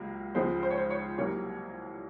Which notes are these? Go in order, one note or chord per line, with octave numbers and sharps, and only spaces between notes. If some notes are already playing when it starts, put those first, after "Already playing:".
Already playing: C#2 C3 F#3 A#3
C#2 C#3 F3 G#3 C5
C5
C#5
C5
C#5
C2 C3 F#3 A#3 C#5